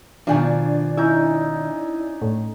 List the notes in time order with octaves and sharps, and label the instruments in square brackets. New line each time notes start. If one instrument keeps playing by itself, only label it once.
[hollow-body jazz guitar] B2 D#3 F3 [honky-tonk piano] D4 G#5
[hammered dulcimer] C#4 D#4 [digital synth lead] E4
[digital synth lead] A2